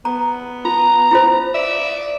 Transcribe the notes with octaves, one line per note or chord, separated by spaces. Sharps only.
B3 A#5
F4 A#5
E4 F4 C5
D5 E5